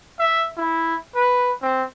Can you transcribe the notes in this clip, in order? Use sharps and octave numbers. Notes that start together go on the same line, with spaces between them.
E5
E4
B4
C4